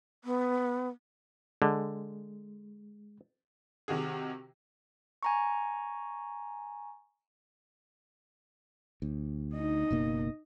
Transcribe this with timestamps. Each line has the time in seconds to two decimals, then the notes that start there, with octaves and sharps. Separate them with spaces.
0.24 B3
1.62 D3 G#3
3.88 C3 D#3 F#4 G#4
5.23 G#5 A#5 C#6
9.02 D2
9.54 D#4 D#5
9.91 F#1 B2 A#3